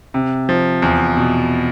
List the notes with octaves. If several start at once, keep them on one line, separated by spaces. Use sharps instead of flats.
C3
F3
E2
B2